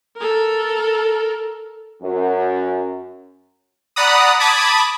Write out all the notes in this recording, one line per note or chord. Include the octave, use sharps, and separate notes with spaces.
A4 A#4
F#2
D5 F#5 A#5 B5 D#6
A5 B5 D6 D#6 G#6